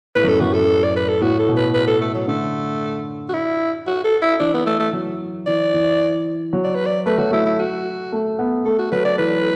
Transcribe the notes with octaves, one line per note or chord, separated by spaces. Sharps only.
A2 B4
F#2
A4
F#2 F#4
A4
D5
B4
A4
A2 F#4
A4
B2
B4
B4
A4
A3
F#3
D3 A3
F#4
E4
F#4
A4
E4
E3 D4
B3
A3
A3
F#3
E3 D5
E3
F#3
D5
B4
D5
A3 B4
F#3 F#4
A3 E4
E4
F#4
A3
B3
A3 A4
F#4
F#3 B4
D5
E3 B4